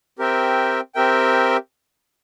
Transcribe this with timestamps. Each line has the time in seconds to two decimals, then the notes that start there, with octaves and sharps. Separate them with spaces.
0.19 C4 G4 A#4 E5 G5
0.95 C4 G4 A#4 E5 G5